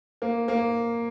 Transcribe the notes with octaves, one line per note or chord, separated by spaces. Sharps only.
A#3
A#3